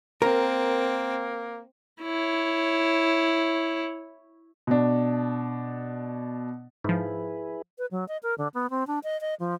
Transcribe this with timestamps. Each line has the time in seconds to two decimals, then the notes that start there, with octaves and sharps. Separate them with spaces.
0.22 A#3 C4 A#4
2.01 E4 C#5
4.67 B2 D4
6.84 G#2 F3 E4 G#4 B4
7.78 B4
7.91 F#3
8.08 D#5
8.23 A#4
8.38 D3
8.54 B3
8.70 C4
8.87 D4
9.04 D#5
9.21 D#5
9.40 F3